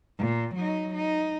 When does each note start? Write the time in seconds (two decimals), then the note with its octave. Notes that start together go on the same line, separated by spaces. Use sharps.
0.19 A#2
0.55 F#3 D#4
0.95 D#4